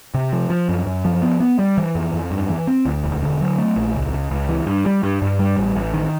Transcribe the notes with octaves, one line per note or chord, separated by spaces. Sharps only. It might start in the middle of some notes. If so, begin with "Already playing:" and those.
C3
F3
F3
F#2
F#2
F3
B3
B3
G3
E3
F2
F2
G2
E3
C4
D2
E1
D3
F#3
A3
A#1
C#2
C#2
C#2
E3
G2
G3
G2
G2
G3
A1
A1
D#3